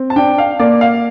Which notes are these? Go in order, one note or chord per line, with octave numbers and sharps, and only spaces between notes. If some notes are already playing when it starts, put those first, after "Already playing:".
Already playing: C4
A5
D4 G5
F5
A#3 D5
F5